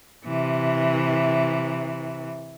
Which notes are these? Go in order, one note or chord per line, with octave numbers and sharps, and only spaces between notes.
C3 E3